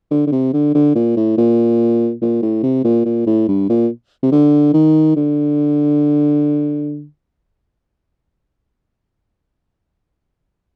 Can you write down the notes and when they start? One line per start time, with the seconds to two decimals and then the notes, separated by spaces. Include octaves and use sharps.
0.11 D3
0.27 D3
0.32 C3
0.53 D3
0.75 D3
0.95 A#2
1.16 A2
1.37 A#2
2.22 A#2
2.42 A2
2.63 C3
2.84 A#2
3.05 A#2
3.27 A2
3.48 G2
3.69 A#2
4.23 C3
4.32 D3
4.74 D#3
5.16 D3